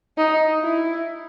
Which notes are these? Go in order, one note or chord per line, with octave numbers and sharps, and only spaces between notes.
D#4
E4